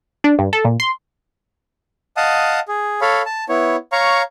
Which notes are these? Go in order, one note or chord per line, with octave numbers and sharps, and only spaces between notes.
D4
G2
A4
A#2
C6
D#5 F5 F#5 A5 D#6
G#4
A4 C#5 F5 B5
A5
B3 E4 C#5
C#5 F5 A#5 C#6